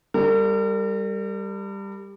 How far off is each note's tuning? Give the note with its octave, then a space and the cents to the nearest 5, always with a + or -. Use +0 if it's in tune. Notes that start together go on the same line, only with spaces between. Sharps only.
G3 +15 A#4 -45